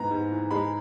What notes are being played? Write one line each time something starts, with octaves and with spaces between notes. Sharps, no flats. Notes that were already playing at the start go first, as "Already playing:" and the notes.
Already playing: G#2 E3 G#3 B3 A#5
G#2
E3
G#3 B5